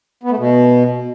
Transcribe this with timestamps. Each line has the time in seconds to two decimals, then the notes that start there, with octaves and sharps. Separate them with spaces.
0.23 B3
0.31 A3
0.38 B2